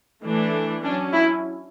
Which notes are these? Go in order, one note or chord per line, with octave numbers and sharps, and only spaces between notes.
E3 A3 D4
F#3 C#4 D4
E4